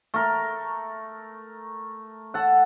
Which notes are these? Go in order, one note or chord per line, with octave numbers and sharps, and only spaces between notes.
A3 A#4
A4 F#5